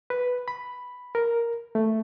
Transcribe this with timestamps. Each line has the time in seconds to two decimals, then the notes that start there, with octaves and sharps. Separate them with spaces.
0.10 B4
0.48 B5
1.15 A#4
1.75 A3